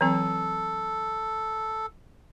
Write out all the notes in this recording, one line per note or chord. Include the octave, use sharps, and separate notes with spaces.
E3 F#3 C4 A4